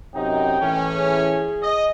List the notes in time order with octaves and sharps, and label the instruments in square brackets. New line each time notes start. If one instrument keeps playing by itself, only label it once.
[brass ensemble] F#2 C3 D#4 [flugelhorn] G5
[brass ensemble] A2 E3 C#4
[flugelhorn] G#4
[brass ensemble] D#5